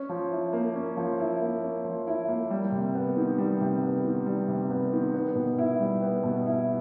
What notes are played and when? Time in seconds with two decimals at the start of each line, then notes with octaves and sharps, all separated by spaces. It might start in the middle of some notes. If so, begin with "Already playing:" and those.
Already playing: C#4
0.09 F3
0.31 E4
0.53 A#3
0.75 C#4
0.97 F3
1.20 E4
1.41 A#3
1.62 C#4
1.85 F3
2.07 E4
2.28 A#3
2.50 G3
2.72 C3
2.95 B3
3.17 D#3
3.38 G3
3.61 C3
3.83 B3
4.05 D#3
4.26 G3
4.48 C3
4.70 B3
4.93 D#3
5.14 B3
5.35 B2
5.59 E4
5.80 G3
6.02 B3
6.23 B2
6.46 E4